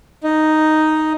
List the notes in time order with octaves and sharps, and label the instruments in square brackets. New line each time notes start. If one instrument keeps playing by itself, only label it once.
[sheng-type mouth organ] D#4